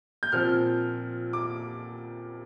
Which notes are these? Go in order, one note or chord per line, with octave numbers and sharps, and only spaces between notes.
G6
A#2 F3 C4 F6
D6